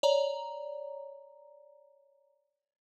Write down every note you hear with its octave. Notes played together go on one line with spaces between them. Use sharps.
C#5 D5 A#5